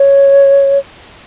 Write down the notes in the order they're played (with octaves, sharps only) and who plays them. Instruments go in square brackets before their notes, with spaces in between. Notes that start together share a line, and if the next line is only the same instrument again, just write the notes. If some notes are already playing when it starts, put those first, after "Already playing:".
Already playing: [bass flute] C#5